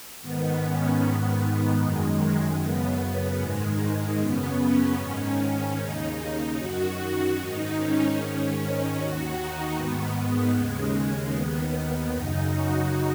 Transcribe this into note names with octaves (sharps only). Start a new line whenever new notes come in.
G#2 D#3 B3
C#4
G#2 D#3 B3
B3
F#2 D#3 G#3
F#2 C#3 B3
G#2 D#3 G#3
F#2 C#3 B3
C#4
G#2 D#3 C#4
D#2 C#3 D#4
F#2 D#3 F#4
G#2 D#3 D#4
C#4
G#2 D#3
D#2 D#3 F#4
D#4
G#2 D#3 B3
D#2 C#3 G#3
D#2 D#3 B3
F#2 C#3 D#4
F#4